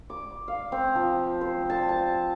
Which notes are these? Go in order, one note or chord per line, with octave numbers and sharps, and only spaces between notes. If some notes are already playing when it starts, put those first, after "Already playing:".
D6
F5
C4
F3
C5
A5
A5